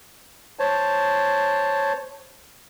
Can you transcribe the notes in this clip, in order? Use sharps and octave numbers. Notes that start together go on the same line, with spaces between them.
C5 C#5 A5